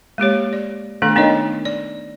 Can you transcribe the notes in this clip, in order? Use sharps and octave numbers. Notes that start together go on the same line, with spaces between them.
G#3 A#3 G4 C#5
D5
D#3 A3 B3 D4 A4
B3 D4 D#4 A#4 C#5 D#5
D5